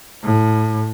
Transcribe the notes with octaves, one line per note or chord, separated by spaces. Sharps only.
A2